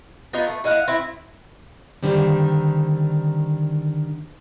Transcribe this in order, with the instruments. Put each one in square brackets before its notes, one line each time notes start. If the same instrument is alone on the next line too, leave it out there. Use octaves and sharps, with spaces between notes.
[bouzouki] B3 D#4 F4 B4
A3
E4 D#5 F5 F#5
C4 E4
[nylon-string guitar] D3 D#3 G3 C4